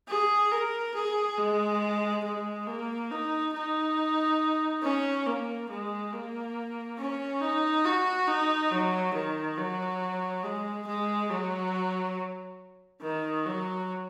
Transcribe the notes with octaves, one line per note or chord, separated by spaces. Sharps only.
G#4
A#4
G#4
G#3
G#3
A#3
D#4
D#4
C#4
A#3
G#3
A#3
C#4
D#4
F#4
D#4
F#3
D#3
F#3
G#3
G#3
F#3
D#3
F#3